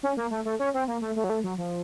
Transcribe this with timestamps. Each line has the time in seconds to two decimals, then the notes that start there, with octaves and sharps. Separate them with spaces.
0.03 C#4
0.17 A#3
0.31 A3
0.45 A3
0.59 C#4
0.74 C4
0.88 A#3
1.01 A3
1.16 A3
1.24 F#3
1.30 A3
1.44 F#3
1.58 F3